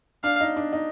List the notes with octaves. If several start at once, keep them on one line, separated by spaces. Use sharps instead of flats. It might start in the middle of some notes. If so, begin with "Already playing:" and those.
D4 F5
D#4
D4
D#4